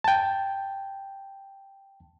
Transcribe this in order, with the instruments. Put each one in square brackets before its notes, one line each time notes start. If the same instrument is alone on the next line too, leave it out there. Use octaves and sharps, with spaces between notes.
[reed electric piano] G5 A5